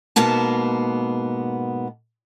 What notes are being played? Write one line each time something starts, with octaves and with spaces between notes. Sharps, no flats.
G#2 B2 A#3 B3 A5